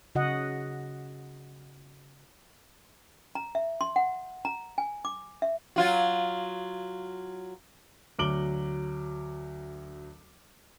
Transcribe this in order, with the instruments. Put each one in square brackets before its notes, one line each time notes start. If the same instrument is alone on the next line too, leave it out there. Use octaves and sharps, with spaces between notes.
[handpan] C#3 F#4 D#5 F#5
[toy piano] A#5
E5
C6
F#5
A#5
G#5
D6
E5
[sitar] F#3 F4 F#4
[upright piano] D2 F#3 D6 D7 F#7 G7